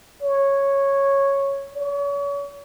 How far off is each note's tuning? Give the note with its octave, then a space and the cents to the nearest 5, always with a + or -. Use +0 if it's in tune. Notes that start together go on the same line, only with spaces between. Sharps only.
C#5 -5
C#5 +40